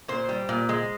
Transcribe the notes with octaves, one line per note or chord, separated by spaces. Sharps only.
A#2 C5
G3
A#2
G#3